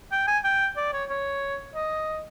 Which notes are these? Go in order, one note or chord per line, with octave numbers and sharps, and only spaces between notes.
G5
G#5
G5
D5
C#5
C#5
D#5